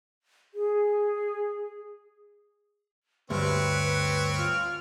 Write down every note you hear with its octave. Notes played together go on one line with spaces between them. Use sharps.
G#4
D2 G2 C4 B4 C#5
F4 F6